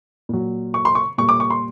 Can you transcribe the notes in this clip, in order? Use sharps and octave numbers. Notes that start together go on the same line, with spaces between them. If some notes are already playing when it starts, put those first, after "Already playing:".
A#2 F#3
C#6
C6
C#6
A#2 G3 C#6
D6
C#6
C6